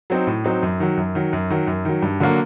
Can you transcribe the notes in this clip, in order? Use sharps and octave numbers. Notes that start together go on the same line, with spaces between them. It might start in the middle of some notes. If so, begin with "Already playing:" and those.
F#3 C4 D#4
A2
F#3 C4 D#4
F#2
D#3 F#3
F#2
D#3 F#3
F#2
D#3 F#3
F#2
D#3 F#3
G2
D3 F#3 A#3 F#4